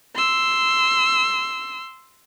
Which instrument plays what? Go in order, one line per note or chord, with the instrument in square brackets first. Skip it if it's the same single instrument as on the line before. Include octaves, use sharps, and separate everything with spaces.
[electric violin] C6 E6